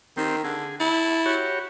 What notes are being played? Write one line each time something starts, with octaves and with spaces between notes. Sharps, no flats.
D#3 C4 G4
D3 G#4
E4 A5
F#4 G4 C#5